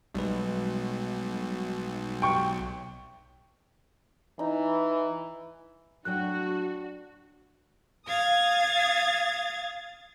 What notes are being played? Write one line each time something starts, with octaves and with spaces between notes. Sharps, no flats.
B1 G3 G#3 B4
G5 C#6
E3 D#4
A2 F#3 D4 F#4 G5 F#6
F5 D#6 G#6 A6